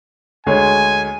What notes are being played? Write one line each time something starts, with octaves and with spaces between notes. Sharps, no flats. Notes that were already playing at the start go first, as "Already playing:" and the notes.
D2 G#3 C#5 G#5